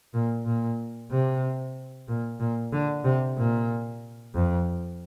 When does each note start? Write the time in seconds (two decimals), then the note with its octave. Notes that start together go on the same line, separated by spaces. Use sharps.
0.14 A#2
0.46 A#2
1.11 C3
2.08 A#2
2.40 A#2
2.73 D3
3.04 C3
3.37 A#2
4.34 F2